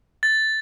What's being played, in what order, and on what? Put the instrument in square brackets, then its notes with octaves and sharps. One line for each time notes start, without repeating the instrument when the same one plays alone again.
[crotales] A6